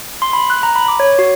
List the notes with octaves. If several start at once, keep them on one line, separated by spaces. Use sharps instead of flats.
C6
B5
F#6
A#5
B5
D6
C#5
F#4